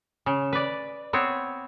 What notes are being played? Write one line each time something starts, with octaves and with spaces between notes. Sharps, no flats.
C#3
B4 D5
B3 C4 C#5